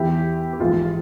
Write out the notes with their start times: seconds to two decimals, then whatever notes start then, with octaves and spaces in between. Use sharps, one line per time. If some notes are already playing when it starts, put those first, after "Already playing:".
Already playing: E2 E3 E4 G4
0.53 G4
0.60 A#1 G#2 E3 F4 G#4